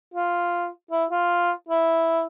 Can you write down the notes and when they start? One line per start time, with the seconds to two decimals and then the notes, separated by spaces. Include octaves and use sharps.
0.14 F4
0.91 E4
1.11 F4
1.69 E4